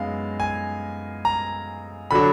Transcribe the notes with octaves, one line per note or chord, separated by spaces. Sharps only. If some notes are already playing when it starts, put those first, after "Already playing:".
Already playing: F#2 G#3 B3 D#4 F5
G#5
A#5
D3 F#3 D4 B5